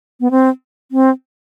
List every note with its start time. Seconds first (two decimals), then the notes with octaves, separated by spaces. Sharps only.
0.20 B3
0.31 C4
0.92 C4